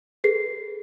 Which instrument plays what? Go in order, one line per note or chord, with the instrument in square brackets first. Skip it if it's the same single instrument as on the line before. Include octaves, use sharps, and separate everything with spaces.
[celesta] G#4 A4 B4 C7